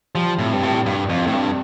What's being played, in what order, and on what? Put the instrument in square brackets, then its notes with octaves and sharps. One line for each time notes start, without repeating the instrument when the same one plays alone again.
[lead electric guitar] F3 [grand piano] G3
[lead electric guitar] A2 [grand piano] C3
[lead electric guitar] G2
[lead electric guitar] A2 [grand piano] G3
[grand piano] C2 [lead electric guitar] G2
[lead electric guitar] F2 [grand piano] C3
[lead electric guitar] A2
[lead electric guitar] G2 [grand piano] G3